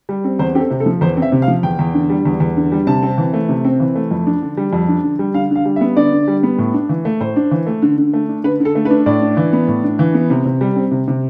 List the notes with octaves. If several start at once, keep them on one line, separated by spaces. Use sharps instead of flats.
G3
C4
E2 C5
C4 G4
A4
C3
A4
F3
E2 C5
C4
E5
C3
F5
F3
E2 G5
E2
D3
G3
E2
E2
D3
G3
C3 A5
C4
E3
A3
C3
C4
E3
A3
F2
D4
D3
G3
F2
D4
D3
G3
D3 F5
D3
F5
G3
E5
B3
D3 D5
D3
G3
B3
A2
D4
E3
A3
A2 C5
D4
E3
A3
D3
D3
A3
D4
D3 B4
D3
A4
A3
B4
D4
A2 D5
D4
E3
B3
A2
D4
E3
B3
C3
C3
G3
C4
C3
C3